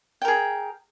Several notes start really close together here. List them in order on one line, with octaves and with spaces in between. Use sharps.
G5 A#4 G#4